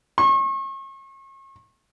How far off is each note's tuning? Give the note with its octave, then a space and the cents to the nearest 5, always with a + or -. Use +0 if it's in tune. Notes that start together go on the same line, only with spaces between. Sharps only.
C#6 -40